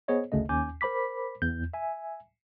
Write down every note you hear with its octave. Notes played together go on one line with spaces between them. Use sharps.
B3 G#4 C5 C#5 D#5
G1 D2 C#3 A3 D#5
D#2 C#4 G#5 D6 G6
A#4 C5 B5 D6 B6
E2 G6
E5 G#5